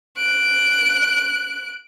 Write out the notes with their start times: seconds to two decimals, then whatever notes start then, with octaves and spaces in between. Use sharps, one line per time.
0.17 F#6 D7